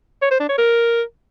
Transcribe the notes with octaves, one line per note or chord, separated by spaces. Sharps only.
C#5
C5
D4
C#5
A#4